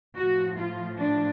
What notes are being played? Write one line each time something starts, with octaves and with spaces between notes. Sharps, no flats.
A2 F3 F#4
F4
D4